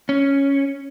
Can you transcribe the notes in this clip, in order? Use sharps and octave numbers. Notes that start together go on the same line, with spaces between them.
C#4